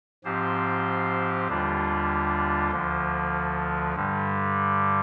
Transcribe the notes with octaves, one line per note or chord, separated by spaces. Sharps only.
G#2 F3 C4 G4 C5
D#2 D3 G3 D4 F4
D2 D3 F3
G2 D3 G3